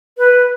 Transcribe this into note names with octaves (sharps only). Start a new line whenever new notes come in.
B4